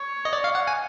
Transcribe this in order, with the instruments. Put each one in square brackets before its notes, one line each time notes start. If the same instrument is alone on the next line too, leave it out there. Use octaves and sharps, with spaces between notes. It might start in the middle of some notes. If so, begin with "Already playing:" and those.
Already playing: [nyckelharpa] C#5
[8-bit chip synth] D#5
D5
F5
F#5
G#5